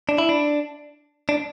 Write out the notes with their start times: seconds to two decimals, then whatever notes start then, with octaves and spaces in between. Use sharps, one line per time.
0.09 D4
0.18 E4
0.29 D4
1.29 D4